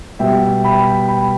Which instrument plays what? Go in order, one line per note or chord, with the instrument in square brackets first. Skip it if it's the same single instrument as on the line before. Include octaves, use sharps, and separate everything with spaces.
[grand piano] B2 G3 B3 E5 G5
G5 B5
G5 B5